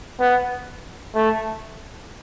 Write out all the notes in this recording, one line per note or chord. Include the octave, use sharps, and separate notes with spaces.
B3
A3